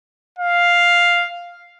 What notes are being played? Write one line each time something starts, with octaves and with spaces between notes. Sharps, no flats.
F5